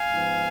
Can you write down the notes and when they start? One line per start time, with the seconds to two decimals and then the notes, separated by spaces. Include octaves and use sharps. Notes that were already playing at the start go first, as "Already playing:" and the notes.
Already playing: F5 G#5
0.11 G#2 F3 B3